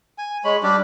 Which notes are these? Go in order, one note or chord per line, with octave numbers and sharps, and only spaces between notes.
G#5
G#3 C#5 B5
G3 D4 G4